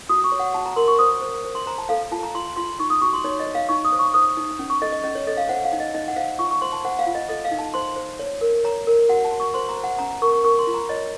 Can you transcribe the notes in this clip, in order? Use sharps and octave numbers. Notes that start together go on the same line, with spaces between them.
F#4 D#6
C#6
C#5
F#5
F#4 A5
A#5
A#4 C6
C#6
C5 D#6
C5
C5
C6
C5 A#5
A5
A4 F5
F4 A5
A#5
F4 C6
F4 C6
D#4 C#6
D#6
F#4 C#6
C6
D#4 C#5
D#5
C#5
F5
D#4 C#6
D#6
C5
C#6
C5 D#6
D#4
C#4
C#6
A4 D#5
D#5
C#4 D#5
C#5
A4 D#5
F5
C5 F#5
F5
D#4
D#5
D#4 D#5
F#5
C5 F5
F4 C#6
C#6
C5 C6
A5
C5 F#5
F5
F4
D#5
A4 D#5
F5
D#4
A5
C5 C6
C5
C#5
A#4
C#5 A#5
A#4
F#4 F#5
A5
F#4
C#6
C5 C6
A#5
C5
F#5
C#4 A#5
A#5
A#4 C#6
C#6
A#4 C#6
C6
F4
A#5
C#5 D#5